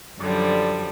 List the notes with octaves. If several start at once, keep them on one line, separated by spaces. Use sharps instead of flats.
F#2 D3 F3 G3